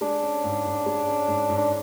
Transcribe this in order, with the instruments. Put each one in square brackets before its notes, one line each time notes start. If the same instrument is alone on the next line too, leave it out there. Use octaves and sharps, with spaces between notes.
[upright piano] G#3 [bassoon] D4
[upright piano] C#4
G#2
G#2
G#3
C#4
G#2
G#2
[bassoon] D4